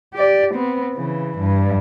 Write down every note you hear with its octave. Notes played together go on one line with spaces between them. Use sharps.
G4 D5
B3 C4
C#3 E3
G2